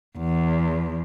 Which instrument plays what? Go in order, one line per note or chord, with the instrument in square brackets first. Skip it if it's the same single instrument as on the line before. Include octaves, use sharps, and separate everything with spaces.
[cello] E2